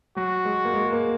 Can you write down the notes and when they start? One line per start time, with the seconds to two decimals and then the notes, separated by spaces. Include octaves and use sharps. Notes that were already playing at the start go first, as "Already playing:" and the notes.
0.16 F#3 F#4
0.45 G#3
0.65 A#3
0.74 G#3
0.92 A#3